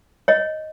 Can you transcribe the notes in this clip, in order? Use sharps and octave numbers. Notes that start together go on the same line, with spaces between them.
C#5 D#5